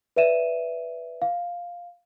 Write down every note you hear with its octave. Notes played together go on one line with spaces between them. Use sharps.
B4 D5 E5 D#7 E7
F5